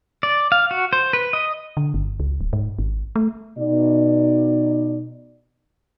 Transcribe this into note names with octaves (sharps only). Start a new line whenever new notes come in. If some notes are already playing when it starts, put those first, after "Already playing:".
D5
F5
F#4
C5
B4
D#5
D3
G1
C#2
D1
G#2
G#1
A3
B2 D#4 D5